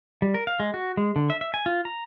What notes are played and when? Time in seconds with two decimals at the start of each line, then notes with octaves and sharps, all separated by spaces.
0.22 G3
0.34 A#4
0.47 F5
0.60 G#3
0.74 F#4
0.97 G#3
1.16 D3
1.30 E5
1.41 E5
1.54 G#5
1.66 F4
1.85 A#5